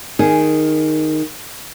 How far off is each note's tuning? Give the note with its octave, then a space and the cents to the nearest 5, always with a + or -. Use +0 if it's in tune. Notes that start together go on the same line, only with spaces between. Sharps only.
D#3 +0 G#4 +0